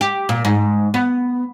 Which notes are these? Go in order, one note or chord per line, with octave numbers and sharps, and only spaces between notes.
G4
A#2
G#2
B3